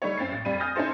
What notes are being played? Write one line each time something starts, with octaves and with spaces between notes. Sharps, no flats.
G3 A3 D#4 C#5
F#2 C4 A6 C7
A1
F2 G3 D#7
G#5 D#6 F6 G6 A6 A#6
C#4 D#4 E4 A4 C5